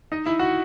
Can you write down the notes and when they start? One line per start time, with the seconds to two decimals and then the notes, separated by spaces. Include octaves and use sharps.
0.12 D#4 D#5
0.26 E4 E5
0.39 F#4 F#5